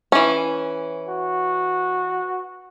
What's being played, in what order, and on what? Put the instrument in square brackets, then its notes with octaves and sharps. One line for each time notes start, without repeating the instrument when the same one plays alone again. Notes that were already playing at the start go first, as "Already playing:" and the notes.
[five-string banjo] E3 C#4
[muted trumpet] F#4